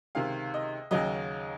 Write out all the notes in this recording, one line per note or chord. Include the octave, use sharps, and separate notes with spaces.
C#2 C3 D#3 F5
D#5
D#2 C#3 F#3 D#5